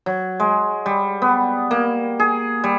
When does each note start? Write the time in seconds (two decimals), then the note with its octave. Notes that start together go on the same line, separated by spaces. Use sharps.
0.06 F#3
0.40 G#3
0.86 G3
1.22 B3
1.71 A#3
2.20 G#4
2.64 G3